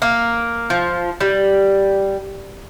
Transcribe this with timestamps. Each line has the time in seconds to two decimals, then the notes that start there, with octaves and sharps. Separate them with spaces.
0.02 A#3
0.70 F3
1.21 G3